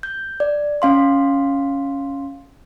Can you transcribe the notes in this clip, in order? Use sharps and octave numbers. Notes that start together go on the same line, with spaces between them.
G6
D5
C#4 F5 C6